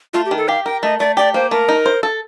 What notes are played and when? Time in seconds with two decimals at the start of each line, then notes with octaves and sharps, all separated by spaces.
0.14 A3 F4
0.26 G4
0.31 D#3
0.37 A4
0.48 G4 F5
0.65 A#4 G5
0.83 A3 D#5
0.99 A3 D5
1.17 G4 D5
1.34 A#3 C5
1.51 A3 A#4
1.69 D#4
1.86 C5
2.03 A4